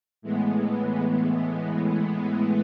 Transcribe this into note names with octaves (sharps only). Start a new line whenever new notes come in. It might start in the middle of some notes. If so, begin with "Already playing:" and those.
A2 E3 G#3 B3